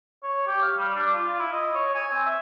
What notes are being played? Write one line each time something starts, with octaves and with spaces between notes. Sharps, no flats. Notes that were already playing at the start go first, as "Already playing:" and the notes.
C#5
G4
F5
G3
D4
F4
E4
D#5
C#5
G#5
C4
E5